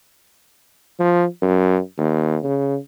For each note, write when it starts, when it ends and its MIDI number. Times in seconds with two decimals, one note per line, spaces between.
1.00 1.25 53
1.42 1.79 42
1.98 2.38 39
2.44 2.77 49